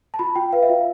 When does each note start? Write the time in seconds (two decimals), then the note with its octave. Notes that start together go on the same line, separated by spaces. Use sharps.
0.14 A5
0.19 F4 B5
0.36 F4 G5
0.52 B4 F5
0.62 E5
0.69 F4 F5